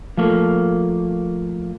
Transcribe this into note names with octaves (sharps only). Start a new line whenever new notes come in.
F3 A3 A#3